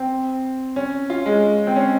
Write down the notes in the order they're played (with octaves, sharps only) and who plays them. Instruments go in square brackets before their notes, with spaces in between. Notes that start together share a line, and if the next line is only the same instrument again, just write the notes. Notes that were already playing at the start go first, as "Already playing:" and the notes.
Already playing: [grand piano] C4
C#4
F4
G#3
C4
C#4